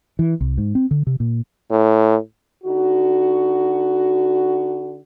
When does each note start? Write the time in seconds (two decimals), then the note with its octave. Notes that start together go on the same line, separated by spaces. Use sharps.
0.19 E3
0.41 C2
0.58 G#2
0.75 C4
0.91 D3
1.07 C3
1.20 A#2
1.70 A2
2.64 D3 D#4 F#4